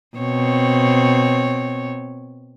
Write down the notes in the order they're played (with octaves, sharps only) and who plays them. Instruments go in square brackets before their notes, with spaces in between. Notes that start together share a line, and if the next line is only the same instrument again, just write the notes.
[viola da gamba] B2 C4 C#5